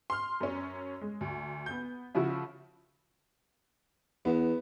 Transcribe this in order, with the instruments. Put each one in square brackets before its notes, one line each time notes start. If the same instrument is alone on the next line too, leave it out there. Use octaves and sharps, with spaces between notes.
[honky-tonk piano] C6 F6
F#2 C#4
G#3
D2
B3 G6
C#3 F3 E4 F#4
[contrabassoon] E2 [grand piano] B3